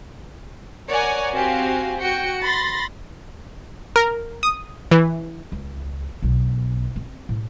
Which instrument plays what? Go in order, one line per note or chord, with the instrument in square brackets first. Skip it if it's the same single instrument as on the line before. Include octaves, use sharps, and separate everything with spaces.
[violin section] A#4 C#5 D5 F#5 G#5
C4 F#4 G4 F5 G#5
F#4 G5 C#7
B5 C6 A6 A#6
[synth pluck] A#4
D#6
E3
[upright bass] C#2
B1 B3
C4
A2